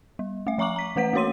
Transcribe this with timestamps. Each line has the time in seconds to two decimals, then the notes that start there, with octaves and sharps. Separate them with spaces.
0.19 G3
0.47 A3 E5
0.58 F3 E5 A#5 C#6 D6 F#7
0.76 A#5 B6
0.96 E3 A3 B4 F#5 B6
1.13 A3 A#3 F#4 C#5 C6 D#7